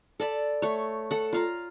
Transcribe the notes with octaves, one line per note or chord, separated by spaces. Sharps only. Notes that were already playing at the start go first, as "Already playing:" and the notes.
A4 D5 A5 B5
A3 C#5
A4 F#5
F4 F5 A#5